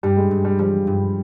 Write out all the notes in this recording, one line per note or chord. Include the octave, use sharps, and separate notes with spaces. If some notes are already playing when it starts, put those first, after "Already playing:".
G2 G3
G#3
G2
G3
F3 G3
G2